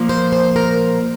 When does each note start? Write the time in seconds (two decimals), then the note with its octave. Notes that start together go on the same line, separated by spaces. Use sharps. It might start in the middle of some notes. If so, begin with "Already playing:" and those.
Already playing: A#2 F3 A#3
0.09 C5
0.32 C5
0.56 A#4